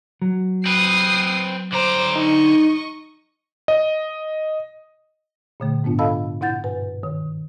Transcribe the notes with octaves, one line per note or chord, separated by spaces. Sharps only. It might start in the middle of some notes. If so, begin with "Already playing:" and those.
F#3
C4 B4 D#6 C7
D3 C5 A#5 D6
D#4 D#5 C#6
D#5
A#2 D3 A3
G#2 B3 D4 F4
A4 D#5 F5 A5 B5 E6
B2 E4 F#5 G6 A6
G2 B4
D#3